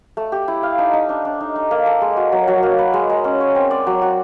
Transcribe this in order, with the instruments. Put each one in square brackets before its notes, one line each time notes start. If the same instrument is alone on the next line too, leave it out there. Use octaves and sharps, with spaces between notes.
[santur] A3
G4
E4
F5
D#4
D#4
D4
D4
D#4
D#4
A#3
A4
G#3
F#4
F#3
F#3
A#3
B4
G#3
G#3
C#4
C#5
C4
D5
F#3
F#4